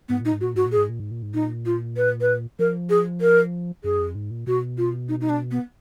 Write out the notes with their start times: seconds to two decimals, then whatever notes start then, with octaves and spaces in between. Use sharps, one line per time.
0.09 G#2 B3
0.21 A#2 D#4
0.32 G#2
0.41 A#2 F#4
0.55 G#2 F#4
0.66 A#2
0.72 G#4
0.77 G#2
0.89 A#2
1.00 G#2
1.11 A#2
1.23 G#2
1.34 A#2 D#4
1.66 F4
1.97 B4
2.21 B4
2.59 F3 A#4
2.90 G#4
3.21 A#4
3.84 F#2 G#4
4.00 F2
4.15 G#2
4.31 A#2
4.47 B2 F#4
4.78 F4
5.09 D#4
5.21 D#4
5.29 D4
5.51 B3